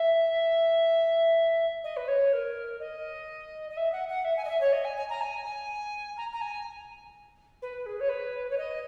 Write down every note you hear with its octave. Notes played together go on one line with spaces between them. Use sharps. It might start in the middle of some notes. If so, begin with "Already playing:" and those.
Already playing: E5
D#5
B4
C#5
A#4
D#5
D#5
E5
F#5
F#5
E5
G#5
D#5
E5
C#5
D#5
G#5
G#5
A#5
G#5
G#5
A#5
A#5
G#5
B4
G#4
C#5
B4
C#5
D#5